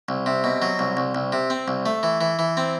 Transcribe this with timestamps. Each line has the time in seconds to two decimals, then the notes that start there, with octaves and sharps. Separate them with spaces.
0.09 C2
0.26 C3
0.44 B2
0.62 F#3
0.79 C2
0.97 C2
1.15 C2
1.32 C3
1.50 C4
1.68 C2
1.86 A3
2.03 E3
2.21 E3
2.39 E3
2.57 C4